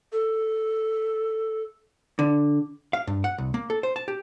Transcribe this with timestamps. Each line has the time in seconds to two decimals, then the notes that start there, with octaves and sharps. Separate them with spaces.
0.12 A4
2.19 D3
2.93 F5
3.07 G2
3.24 F#5
3.38 C2
3.54 A#3
3.70 A4
3.83 C5
3.96 A5
4.08 G4